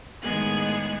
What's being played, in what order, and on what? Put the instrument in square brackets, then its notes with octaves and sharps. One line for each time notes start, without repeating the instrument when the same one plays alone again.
[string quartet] A2 D#3 G#3 B3 G#4 F#6